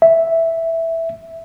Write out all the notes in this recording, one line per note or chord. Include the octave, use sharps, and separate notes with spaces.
E5